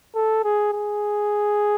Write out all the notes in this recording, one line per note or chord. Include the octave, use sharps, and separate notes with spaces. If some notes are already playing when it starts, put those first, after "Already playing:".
A4
G#4
G#4